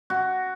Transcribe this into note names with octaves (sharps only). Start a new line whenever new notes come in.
F#4